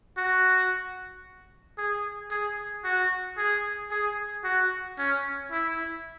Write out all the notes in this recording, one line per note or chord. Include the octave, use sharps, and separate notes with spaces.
F#4
G#4
G#4
F#4
G#4
G#4
F#4
C#4
E4